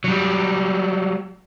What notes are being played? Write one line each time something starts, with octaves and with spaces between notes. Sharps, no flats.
F#3 G3